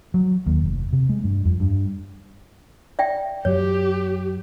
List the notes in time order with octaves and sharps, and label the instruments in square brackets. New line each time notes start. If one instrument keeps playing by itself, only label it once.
[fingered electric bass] F#3
D#2
F1
C3
G#3
G2
F2
G2
[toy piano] D5 E5 G5
[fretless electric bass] F#2 F#3 [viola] G4 [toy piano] C#5